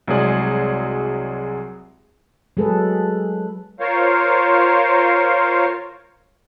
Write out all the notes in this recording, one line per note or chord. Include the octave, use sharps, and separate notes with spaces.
C2 F#3 G#3 G#4 D5
F#3 G#3 G#4 A4 B4
F4 A#4 C5 C#5 F5